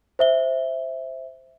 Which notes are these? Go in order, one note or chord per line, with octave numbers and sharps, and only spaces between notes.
C5 E5 G7